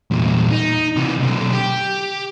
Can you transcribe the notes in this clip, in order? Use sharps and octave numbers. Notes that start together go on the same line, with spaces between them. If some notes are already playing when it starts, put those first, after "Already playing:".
E2 A#2
D#4
C3 E3
B1 D3
G4